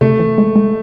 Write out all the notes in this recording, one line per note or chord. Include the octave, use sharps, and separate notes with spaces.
C3 A3
E3
G#3
G#3